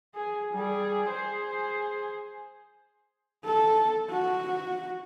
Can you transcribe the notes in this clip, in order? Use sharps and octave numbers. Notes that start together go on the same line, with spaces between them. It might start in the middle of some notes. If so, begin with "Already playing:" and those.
G#4 G#5
G3 G#4
G#4 C5
A4
F#4